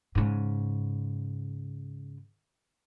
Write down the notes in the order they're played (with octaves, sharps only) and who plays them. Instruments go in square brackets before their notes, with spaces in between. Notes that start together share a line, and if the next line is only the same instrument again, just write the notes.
[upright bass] G#2 C#3